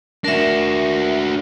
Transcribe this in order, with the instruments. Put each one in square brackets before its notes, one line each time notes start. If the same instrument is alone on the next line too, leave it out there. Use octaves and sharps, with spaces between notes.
[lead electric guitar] D4 F#4 [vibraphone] A#4 E5